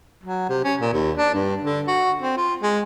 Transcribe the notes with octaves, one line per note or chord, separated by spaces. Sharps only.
F#3
C3
C#4
A#2
D#2
D4
G2
D3
F#4
C4
F4
G#3